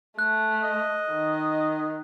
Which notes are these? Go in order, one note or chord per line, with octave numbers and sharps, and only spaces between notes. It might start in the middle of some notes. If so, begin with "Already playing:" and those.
A3 F#6
D#5
D#3